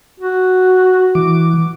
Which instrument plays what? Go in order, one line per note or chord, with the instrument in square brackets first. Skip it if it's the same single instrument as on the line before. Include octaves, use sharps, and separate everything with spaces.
[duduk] F#4
[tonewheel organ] E3 D6